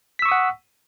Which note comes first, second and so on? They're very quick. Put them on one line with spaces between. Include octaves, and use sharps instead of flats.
B6 E6 C#6 D#6 F#5